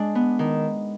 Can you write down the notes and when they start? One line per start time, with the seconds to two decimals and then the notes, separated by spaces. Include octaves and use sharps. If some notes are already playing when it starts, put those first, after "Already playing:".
Already playing: G#3 D4
0.15 B3
0.39 D#3